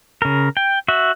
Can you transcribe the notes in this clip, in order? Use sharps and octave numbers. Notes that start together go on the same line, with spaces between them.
C#3 A#4
G5
F#4 E5